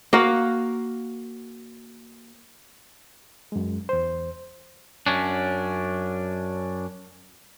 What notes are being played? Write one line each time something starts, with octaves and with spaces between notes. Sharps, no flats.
A#3 F#4 F5 F#5
F#2 G#3
E2 C5
F#2 C#4 D4